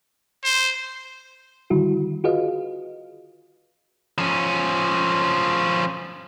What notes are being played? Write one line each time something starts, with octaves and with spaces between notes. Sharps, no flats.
C5
D3 D#3 G3 E4 F#4
F4 F#4 G#4 B4 D#5 F5
F3 C#4